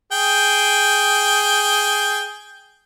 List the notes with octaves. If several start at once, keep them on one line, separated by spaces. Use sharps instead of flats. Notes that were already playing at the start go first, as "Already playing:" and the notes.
G#4 G5